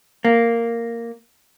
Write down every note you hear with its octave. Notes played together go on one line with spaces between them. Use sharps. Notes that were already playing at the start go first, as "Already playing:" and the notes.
A#3